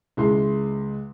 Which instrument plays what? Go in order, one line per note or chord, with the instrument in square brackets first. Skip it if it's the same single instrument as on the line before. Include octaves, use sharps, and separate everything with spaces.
[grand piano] C#2 G#3 E4 C6